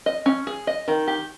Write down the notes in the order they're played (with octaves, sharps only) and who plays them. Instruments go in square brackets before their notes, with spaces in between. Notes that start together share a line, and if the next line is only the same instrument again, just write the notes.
[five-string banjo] D#5
C#4
G#4
D#5
D#3
G4